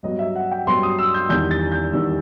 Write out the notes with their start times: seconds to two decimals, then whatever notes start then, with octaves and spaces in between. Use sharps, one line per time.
0.03 G2 F#3 B3 D#5
0.19 E5
0.35 F#5
0.51 G5
0.67 G2 F#3 B3 C6
0.83 D#6
0.98 E6
1.14 G6
1.29 E2 D#3 G3 G6
1.51 A6
1.72 G6
1.93 E2 D#3 G3 E6